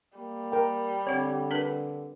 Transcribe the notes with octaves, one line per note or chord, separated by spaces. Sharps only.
G3 A#3
A#4 G5
D3 C4 C#5 F#5
D4 A#4 B4